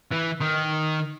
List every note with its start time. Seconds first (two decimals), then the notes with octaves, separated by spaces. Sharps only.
0.12 E3
0.41 D#3